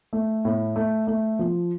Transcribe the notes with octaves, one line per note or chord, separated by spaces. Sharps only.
A3
A2
A3
A3
F3